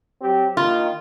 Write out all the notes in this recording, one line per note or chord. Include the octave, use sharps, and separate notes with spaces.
F#3 C4 G4
D#3 A#3 F4